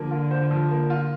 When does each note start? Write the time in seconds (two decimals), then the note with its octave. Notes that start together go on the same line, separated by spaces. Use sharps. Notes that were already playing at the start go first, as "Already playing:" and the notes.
Already playing: D3 F3 A#3
0.11 F4
0.31 C5
0.51 F3
0.71 A#3
0.90 F4